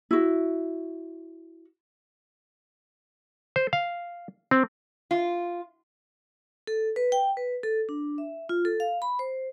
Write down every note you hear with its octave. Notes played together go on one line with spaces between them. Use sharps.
E4 F#4
C5
F5
C4
F4
A4
B4
G5
B4
A4
D4
E5
F4
A4
F5
B5
C5